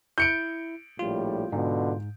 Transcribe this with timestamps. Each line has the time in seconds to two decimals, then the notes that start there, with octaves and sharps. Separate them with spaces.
0.18 E4 G6 C#7 D7
0.99 A#1 A2 G3 F4
1.52 G#2 B2 D3 F4